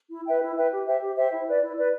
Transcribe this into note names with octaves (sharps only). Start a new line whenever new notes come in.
E4
B4 E5 G5
E4
B4 E5 G5
G4
C5 E5 G5
G4
C5 E5 G5
E4
B4 D5
E4
B4 D5